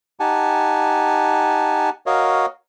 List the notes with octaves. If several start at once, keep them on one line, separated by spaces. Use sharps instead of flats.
D#4 G4 F#5 G#5 A5
F#4 A#4 C#5 D#5 F5